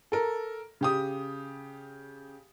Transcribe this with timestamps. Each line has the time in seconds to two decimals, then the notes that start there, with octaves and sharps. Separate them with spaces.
0.12 A4 A#4
0.81 C#3 G4 D#6